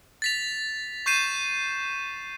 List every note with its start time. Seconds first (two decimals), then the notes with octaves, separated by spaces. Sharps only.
0.22 A6 B6 F7
1.06 C#6 G6 C7 D#7 E7